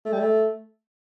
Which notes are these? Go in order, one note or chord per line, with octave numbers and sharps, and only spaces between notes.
A3
G3
A3